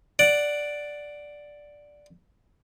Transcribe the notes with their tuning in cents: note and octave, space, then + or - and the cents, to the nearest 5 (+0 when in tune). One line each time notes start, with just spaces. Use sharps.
D5 +0 F#5 +0